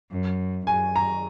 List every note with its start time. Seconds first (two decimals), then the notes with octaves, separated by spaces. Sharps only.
0.11 F#2
0.67 F#2 G#5
0.96 A#5